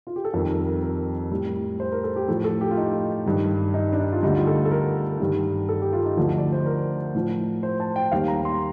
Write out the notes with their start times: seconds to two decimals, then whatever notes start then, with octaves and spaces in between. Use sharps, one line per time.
0.07 F4
0.16 G4
0.25 A4
0.34 F2 D#3 G3 A#4
0.50 A#4
0.66 A#4
0.82 A#4
1.32 A2 G3
1.80 C5
1.92 A#4
2.04 A4
2.16 G4
2.28 A2 F3 A4
2.44 A4
2.61 G4
2.71 F4
2.77 D#4
3.26 G2 D#3 G3
3.74 D#4
3.93 D4
3.99 D#4
4.12 F4
4.23 D2 D3 G3 D#4
4.35 F4
4.47 A4
4.65 A4
4.71 A#4
5.20 G2 D#3 G3
5.69 A4
5.82 G4
5.93 F4
6.05 D#4
6.17 D2 D3 F3
6.38 D5
6.52 C5
6.66 A#4
7.15 A2 F3
7.63 C5
7.80 A5
7.96 G5
8.12 D#2 D#3 G3 F5
8.28 A#5
8.45 C6